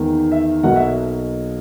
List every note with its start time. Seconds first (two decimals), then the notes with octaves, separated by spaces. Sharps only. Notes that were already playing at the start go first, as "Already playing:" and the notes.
Already playing: E2 D#3 A#3
0.32 E5
0.63 B1 B2 F#3 A#3 F#5
0.76 E5